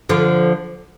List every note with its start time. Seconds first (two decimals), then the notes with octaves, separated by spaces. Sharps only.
0.09 D3 F3